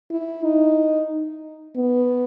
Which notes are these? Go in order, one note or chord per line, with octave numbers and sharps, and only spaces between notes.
E4
D#4
B3